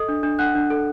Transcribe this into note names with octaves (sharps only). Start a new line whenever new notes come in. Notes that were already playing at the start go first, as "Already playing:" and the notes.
Already playing: A4 D#5 D#6
D4
D4
D4 F#5 F#6
D4
A4